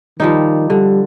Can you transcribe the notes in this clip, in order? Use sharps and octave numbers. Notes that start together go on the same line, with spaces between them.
D#3 F3 G3 D#4
D3 G3